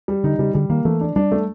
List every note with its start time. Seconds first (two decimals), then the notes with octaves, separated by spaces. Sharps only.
0.08 G3
0.24 D3 D#4
0.39 C#3 G3
0.54 D3 G3
0.69 D#3 A#3
0.85 E3 A3
1.01 D4
1.16 G3 D4
1.32 A3